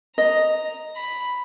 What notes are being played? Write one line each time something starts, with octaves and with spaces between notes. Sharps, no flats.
D#5 A#5
B5